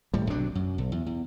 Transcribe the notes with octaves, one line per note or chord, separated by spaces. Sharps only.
D#1 A2 G3
B1 C3 F#3 D4
F#2
B1
E2
E2